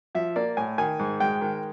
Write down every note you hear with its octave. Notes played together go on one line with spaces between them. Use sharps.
F3 E5
A#3 D5
A2 G#5
D#3 G#5
G#2
G#3 G5
D#3